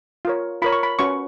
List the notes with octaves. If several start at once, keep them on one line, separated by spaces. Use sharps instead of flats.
F4 A#4 C#5
F4 A#4 C#5 B5
C#6
B5
C#4 F#4 B4 C#6